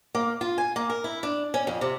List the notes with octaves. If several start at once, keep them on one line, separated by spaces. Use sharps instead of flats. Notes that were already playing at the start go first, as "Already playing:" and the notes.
A#3
F4
G#5
A#3
A#4
E4
D4
C#4
F2
C3